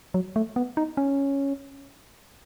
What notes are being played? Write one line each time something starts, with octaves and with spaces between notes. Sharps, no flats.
F#3
A3
B3
D#4
C#4